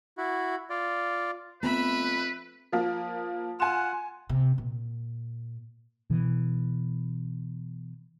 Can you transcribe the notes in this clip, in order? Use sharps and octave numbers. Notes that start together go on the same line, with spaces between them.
E4 F#4
F4 D5
F2 A3 B3 C4 B4 E5 B5
F3 A#3
F4 F#5 G#5 E7
C3
A#2
B2 E3